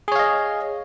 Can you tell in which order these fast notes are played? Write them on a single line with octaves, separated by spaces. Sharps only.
G#4 C#5 F5 D#5